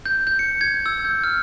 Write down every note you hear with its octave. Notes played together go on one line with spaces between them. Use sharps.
G6
G6
C#7
G#6
E6
G6
F6